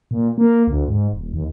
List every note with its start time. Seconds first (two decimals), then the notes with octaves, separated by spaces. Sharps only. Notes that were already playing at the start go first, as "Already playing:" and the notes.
0.11 A#2
0.38 A#3
0.67 D2
0.88 G#2
1.13 D#1
1.33 D#2